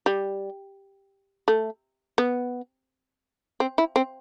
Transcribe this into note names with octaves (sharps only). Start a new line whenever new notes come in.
G3
A3
B3
C4
E4
C4